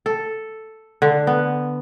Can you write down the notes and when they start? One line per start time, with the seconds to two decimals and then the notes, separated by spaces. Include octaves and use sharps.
0.06 A4
1.02 D3
1.27 B3